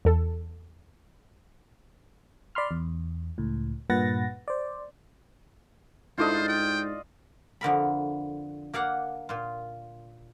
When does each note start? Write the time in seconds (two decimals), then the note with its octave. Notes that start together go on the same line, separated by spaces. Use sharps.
0.05 E2 A4
2.55 D5 B5 C6 F6
2.71 E2
3.38 C#2 A2
3.90 G2 A#2 B4 F#5 A6 A#6
4.48 C5 D5
6.18 G#2 D4 E4 F4 A4 C5 D5 D#5
6.48 G5
7.61 F2 D3 A#4 B5
8.74 A#3 D5 F5 F#5
9.29 A#2 F4